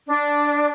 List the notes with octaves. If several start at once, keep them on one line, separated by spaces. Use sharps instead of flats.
D4